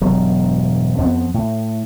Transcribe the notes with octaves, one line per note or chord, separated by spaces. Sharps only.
E1 G2 F#3
F2 F3 A#3 B3
A2